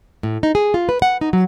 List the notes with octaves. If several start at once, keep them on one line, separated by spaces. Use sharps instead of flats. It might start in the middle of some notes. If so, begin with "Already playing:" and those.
A2
D#4
G#4
F4
B4
F#5
D#4
F#3